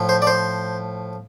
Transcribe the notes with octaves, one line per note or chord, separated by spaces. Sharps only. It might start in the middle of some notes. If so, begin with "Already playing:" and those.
Already playing: A2 F3
C5
D5
C5